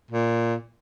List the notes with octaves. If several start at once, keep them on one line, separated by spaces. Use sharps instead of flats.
A#2